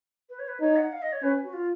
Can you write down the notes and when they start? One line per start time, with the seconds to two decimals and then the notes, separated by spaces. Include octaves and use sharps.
0.30 B4
0.39 C#5
0.48 B4
0.60 D#4 C#5
0.77 F#5
0.92 F5
1.02 D#5
1.12 C#5
1.23 C#4 B4
1.43 F#4
1.53 F4